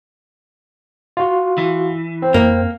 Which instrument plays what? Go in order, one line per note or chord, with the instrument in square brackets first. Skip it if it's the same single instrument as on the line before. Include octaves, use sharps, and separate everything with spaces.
[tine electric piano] F4 F#4
[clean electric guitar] E3
[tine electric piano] C4
[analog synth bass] F2 [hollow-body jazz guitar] A#3